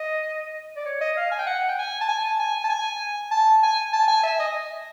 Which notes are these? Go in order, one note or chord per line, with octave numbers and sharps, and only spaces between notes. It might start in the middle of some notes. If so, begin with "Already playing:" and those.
Already playing: D#5
D5
C#5
D#5
F5
G#5
G5
F#5
G5
G#5
A5
G#5
A5
G#5
A5
G#5
A5
G#5
A5
G#5
E5
D#5